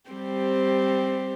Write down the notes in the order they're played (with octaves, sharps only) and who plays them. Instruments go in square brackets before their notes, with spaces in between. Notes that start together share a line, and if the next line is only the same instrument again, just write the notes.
[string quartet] G3 C4 G4 C5